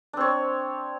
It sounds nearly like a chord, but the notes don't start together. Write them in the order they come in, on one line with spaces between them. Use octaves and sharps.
D4 C4 C#5